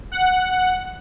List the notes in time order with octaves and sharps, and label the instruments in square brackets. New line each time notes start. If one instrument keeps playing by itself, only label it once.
[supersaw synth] F#5